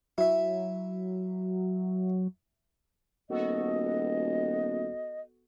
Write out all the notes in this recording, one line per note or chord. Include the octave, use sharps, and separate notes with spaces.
F#3 E4 E5
D#1 B3 F#4 A4 D#5